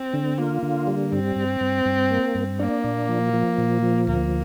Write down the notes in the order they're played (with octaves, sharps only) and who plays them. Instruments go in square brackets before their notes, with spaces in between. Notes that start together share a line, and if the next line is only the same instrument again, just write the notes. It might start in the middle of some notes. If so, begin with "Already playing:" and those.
Already playing: [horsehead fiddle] C4
[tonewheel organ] D3
[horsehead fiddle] A#3 [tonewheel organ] F4
[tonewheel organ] D3
G3
[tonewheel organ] G2 [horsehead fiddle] C4
[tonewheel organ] G2
G2
G2
A#3
G2
[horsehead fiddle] A#3 [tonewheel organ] D4
[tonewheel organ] A#2
F3
F3
A#2
F3
[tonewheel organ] D2 [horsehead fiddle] A#3